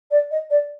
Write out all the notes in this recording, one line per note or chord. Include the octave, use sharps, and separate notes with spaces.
D5
D#5
D5